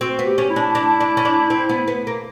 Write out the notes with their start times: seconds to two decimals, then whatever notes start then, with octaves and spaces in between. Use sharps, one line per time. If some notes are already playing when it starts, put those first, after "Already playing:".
0.01 C4 F#4
0.19 B3
0.26 G4
0.38 C#4
0.50 E4
0.56 D4
0.75 D4
1.00 D4
1.17 C#4
1.25 D4
1.50 C4
1.69 B3
1.88 B3
2.07 A#3